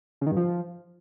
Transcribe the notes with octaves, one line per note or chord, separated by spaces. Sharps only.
C#3
D#3
G2
F3